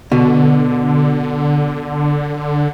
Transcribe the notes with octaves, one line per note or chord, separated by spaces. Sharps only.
B2 D3